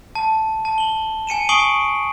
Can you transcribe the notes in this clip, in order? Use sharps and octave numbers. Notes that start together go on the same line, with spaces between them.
A5
A5
F#7 G7
G#5 C#7 D#7 E7
G#5 C#6 D#6 C7 D7 F#7